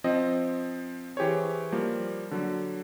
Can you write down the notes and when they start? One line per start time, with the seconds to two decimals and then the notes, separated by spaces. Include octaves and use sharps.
0.04 F3 C4 D#5
1.17 E3 G4 G#4 C5 C#5
1.72 F3 G3 A#3
2.31 D3 F#3